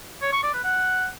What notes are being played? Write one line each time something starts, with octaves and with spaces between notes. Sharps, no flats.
C#5
C#6
D5
B4
F#5